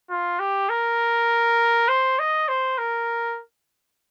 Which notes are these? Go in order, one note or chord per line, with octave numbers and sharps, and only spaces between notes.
F4
G4
A#4
C5
D#5
C5
A#4